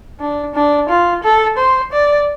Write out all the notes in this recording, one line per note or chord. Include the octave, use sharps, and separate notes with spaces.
D4
D4
F4
A4
C5
D5